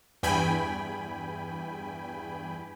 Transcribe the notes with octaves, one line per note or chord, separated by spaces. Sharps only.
E2 G2 G5 G#5 B5